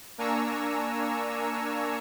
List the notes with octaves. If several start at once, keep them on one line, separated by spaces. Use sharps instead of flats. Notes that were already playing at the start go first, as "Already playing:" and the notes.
A#3 D4 G#5 A#5 C#6 E6